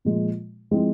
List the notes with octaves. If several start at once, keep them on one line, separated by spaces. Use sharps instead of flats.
A#2 F3 G#3
F3 G#3 C4 E4